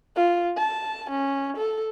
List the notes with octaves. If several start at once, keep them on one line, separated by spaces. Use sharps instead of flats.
F4
A5
C#4
A4